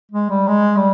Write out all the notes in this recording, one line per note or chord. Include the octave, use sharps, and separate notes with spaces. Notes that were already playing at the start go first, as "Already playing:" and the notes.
G#3
G3
G#3
G3